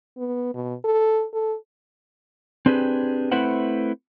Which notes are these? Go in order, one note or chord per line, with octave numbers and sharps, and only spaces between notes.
B3
B2
A4
A4
C4 D4 G4 G#4 B4
A3 C4 E4 B4 C5 F#5